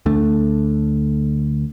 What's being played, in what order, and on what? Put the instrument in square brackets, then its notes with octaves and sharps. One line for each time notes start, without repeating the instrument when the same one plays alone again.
[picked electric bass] D2 D3 A3